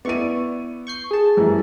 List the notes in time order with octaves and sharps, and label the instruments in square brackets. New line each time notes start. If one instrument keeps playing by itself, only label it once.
[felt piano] B3 E4 D#7 [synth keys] D5 C#6
[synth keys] C#6 G6 C7
G#4 A5
[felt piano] F#2 E3 G3